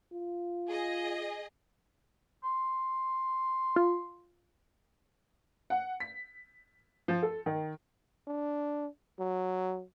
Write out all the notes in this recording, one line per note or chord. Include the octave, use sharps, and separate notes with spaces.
F4
G#4 D#5
C6
F4
F#5
B6
F3
A4
D#3
D4
F#3